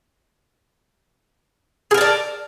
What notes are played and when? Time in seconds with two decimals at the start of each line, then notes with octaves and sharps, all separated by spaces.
1.91 G#4
1.94 A#4
1.98 A5
2.01 D5